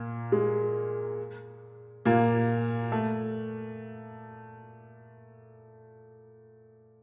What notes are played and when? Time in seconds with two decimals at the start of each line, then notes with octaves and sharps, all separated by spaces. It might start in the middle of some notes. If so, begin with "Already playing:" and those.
Already playing: A#2 A#3
0.32 G#3
2.05 A#2 A#3
2.92 A3